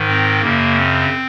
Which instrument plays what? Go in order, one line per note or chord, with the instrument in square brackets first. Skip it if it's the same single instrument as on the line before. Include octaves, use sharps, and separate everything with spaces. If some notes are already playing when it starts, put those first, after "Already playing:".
Already playing: [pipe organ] G#2 D#3
C4
F#2 C#3 A#3
C4